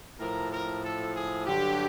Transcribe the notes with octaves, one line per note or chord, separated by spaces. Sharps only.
A2 F3 A#4
A#4
A4
G#4
G2 D3 F#3 G4